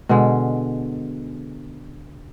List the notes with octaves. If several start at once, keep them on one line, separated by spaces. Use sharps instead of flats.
B2 D3 G#3